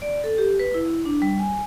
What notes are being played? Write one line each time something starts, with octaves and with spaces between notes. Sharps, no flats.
D5
A4
G4
B4
E4
D4
G3
G#5